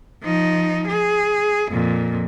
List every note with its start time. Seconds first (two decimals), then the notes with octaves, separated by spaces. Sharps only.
0.22 F3 D#4
0.87 G#4
1.71 F2 A#2